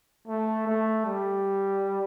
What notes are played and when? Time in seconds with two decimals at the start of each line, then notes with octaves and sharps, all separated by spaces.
0.28 A3
0.67 A3
1.06 G3